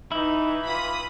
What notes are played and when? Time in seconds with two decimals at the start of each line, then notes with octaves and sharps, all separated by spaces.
0.12 E3 D#4 E4 B4
0.67 F4 B5 D#6